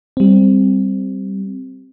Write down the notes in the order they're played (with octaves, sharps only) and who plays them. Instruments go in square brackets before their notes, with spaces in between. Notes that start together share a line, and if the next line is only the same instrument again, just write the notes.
[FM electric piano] G3 C4